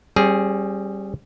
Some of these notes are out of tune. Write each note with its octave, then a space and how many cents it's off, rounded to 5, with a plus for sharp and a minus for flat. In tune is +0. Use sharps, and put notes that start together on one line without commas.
G3 +0 C#4 -45 G#4 +0